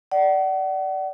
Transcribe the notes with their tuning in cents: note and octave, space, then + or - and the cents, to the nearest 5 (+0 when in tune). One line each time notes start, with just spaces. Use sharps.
D5 +0 F#5 +35